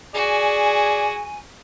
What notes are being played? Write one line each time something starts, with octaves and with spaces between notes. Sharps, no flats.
F#4 G#4 D5 G#5